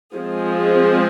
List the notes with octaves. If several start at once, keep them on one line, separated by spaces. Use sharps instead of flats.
F3 G#3 C4 G#4